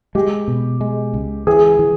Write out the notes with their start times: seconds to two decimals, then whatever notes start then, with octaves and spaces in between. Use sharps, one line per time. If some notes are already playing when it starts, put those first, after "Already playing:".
0.15 G#3 G4
0.48 B2
0.81 G#3
1.14 C#2
1.47 E3 G#4
1.79 E3